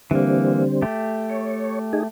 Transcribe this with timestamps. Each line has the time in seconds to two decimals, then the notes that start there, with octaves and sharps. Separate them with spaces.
0.11 D3 E3 G3 A#3 C4
0.82 A3 G4
1.30 C#5
1.93 D#4 G#4